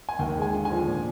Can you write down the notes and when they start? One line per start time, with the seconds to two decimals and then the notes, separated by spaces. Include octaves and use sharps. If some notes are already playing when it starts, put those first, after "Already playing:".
0.09 G#5
0.19 D#2 G5
0.37 G#3
0.42 G#5
0.53 D3
0.65 G#5
0.71 F3
0.88 A#2